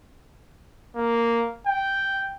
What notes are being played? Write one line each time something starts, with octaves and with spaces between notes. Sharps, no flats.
A#3
G5